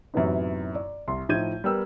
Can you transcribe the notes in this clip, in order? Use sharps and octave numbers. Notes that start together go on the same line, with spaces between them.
F#2 A2 C3 E3 B3 D#4
D5
C2 C6
A2 F3 D#4 G6 G#6 D#7
G3 B3 A#4 G5 E6